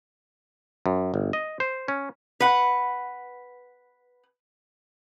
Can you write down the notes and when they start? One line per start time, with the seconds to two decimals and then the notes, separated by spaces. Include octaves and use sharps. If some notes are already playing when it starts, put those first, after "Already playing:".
0.86 F#2
1.14 G1
1.33 D#5
1.60 C5
1.88 C#4
2.40 B4 F#5